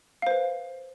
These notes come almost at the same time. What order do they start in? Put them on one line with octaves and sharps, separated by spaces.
F5 C5 B4